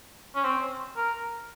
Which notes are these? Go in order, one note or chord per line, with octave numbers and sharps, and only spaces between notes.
C#4
C4
A#4